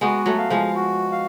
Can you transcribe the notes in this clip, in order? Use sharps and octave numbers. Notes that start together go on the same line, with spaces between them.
G#3 B3 F#4
F#3 A3
F5
F3 G#3
F#4
F5